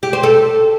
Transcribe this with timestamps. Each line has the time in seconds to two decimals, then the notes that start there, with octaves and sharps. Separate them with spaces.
0.03 G4
0.13 C5
0.23 A4